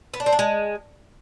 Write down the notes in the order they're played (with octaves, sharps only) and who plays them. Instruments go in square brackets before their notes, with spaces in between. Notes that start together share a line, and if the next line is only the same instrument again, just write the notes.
[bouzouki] B3
D4
C4
D4
G#3